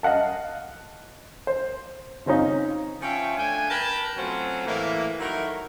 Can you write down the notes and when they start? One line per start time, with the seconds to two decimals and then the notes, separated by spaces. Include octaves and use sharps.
0.03 D#5 F5 F#5 A5
1.47 C5
2.26 C#3 C4 C#4 D#4 F4
3.01 F3 C#4 F4 C#5 E5 G5
3.36 A3 D4 G5 G#5
3.70 A#4 B4 G5 A5 B5
4.17 F#3 A3 C4 C#4 F4 F#4
4.65 A2 E3 A#3
5.19 D#3 F#3 A3 E4 A#4